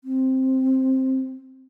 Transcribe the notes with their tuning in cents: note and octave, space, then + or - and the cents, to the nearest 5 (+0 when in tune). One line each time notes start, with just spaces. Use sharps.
C4 +5